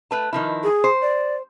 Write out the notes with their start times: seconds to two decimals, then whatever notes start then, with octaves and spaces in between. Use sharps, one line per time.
0.11 A3 B4 A5
0.33 D#3 F3 E4
0.63 G#4
0.84 C5
1.02 D5